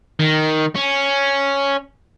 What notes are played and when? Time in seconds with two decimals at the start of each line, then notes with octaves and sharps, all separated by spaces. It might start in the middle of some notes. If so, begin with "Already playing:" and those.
0.20 D#3
0.75 C#4